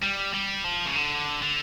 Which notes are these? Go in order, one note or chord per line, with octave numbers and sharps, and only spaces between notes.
G3
G3
F3
C#3
D3
D3